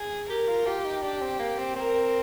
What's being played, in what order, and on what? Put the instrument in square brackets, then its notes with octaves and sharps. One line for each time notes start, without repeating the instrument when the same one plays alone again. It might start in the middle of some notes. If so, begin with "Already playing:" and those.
Already playing: [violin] G#4
[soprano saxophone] G4 [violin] A#4
[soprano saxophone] F4
[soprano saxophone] F4 [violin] G4
[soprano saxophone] D#4
[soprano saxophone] D4 [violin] G4
[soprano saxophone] C4
A#3
C4
[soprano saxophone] C4 [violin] A#4